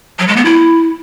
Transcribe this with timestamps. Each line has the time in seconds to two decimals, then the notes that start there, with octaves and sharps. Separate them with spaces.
0.19 F#3
0.28 G#3
0.36 B3
0.45 E4